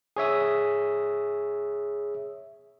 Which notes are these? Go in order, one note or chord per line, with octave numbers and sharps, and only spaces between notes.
G#4 C#5 E5 D#6